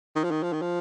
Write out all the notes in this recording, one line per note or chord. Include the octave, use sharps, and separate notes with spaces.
D#3
F3
D#3
F3
D#3
F3